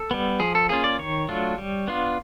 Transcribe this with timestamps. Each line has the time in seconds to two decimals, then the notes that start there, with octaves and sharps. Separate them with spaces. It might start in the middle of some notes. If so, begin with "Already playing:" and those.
Already playing: A4
0.11 G3 B3
0.40 F3 G#4
0.55 A4
0.69 A#3 C#4 F4 G#4
0.84 D5
0.99 D#3 C#5
1.29 F#3 A3 D4 F4
1.58 G3
1.88 B3 D4 F4